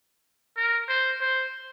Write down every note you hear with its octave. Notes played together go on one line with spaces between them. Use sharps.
A#4
C5
C5